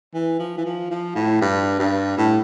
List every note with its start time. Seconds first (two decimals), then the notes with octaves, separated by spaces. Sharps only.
0.14 E3
0.39 F3
0.58 E3
0.65 F3
0.91 F3
1.15 A2
1.41 G2
1.79 G2
2.17 A2